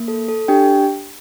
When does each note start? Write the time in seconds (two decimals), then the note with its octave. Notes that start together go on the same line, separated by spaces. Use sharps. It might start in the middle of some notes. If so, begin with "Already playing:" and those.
Already playing: A#3
0.08 A4
0.28 A4
0.48 D4 G4 G5